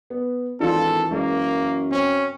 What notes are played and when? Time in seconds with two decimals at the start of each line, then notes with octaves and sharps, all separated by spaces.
0.10 B3
0.60 G#1 E3 D4 D#4 F4 A4
1.11 F#2 G#3 A#3
1.92 C4 C#4